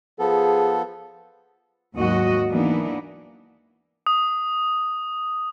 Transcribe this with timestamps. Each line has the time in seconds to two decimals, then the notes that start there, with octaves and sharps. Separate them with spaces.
0.19 F3 B3 G#4 A4
1.94 D#2 G#2 F#3 F#4 D#5
2.48 E3 A#3 B3 D4 D#4
4.07 D#6